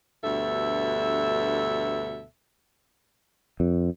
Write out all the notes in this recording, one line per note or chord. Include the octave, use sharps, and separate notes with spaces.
D2 G2 B2 A4 E5
F2